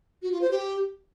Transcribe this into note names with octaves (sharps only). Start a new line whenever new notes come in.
F#4
F4
C5
G4